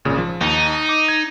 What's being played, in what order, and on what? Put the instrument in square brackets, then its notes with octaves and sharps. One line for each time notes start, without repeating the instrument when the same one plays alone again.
[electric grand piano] G#1 A#2 C#3
F3
[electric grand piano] D#2 [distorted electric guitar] D#4
[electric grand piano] D6
G#6